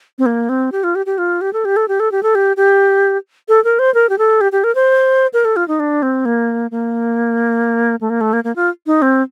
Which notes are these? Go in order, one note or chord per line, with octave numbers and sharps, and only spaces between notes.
C4
A#3
C4
G4
F4
G4
G4
F4
G4
A4
G4
A4
G4
A4
G4
A4
G4
G4
A4
A#4
C5
A#4
G4
A4
G4
G4
A#4
C5
A#4
A4
F4
D#4
D4
C4
A#3
A#3
A3
A#3
A3
A#3
A#3
F4
D#4
C4